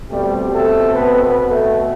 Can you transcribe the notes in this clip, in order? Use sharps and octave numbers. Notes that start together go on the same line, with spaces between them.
B2 G3 A3 C4 G4
A3 A4
B3 B4
B3 B4
A3 A4